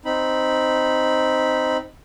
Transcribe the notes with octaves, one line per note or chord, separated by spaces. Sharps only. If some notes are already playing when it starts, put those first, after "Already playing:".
C4 D#4 B5